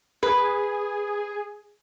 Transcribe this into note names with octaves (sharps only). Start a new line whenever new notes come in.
G#4 B4